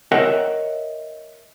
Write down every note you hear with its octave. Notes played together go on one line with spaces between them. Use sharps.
A#4 C#5 D#5 E5 F#5 G5